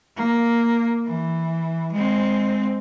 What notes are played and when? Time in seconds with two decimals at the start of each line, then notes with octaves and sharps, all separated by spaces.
0.16 A#3
1.06 E3
1.92 G#3 C4